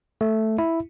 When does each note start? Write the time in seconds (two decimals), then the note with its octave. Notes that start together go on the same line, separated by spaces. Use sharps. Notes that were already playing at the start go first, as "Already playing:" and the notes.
0.21 A3
0.59 E4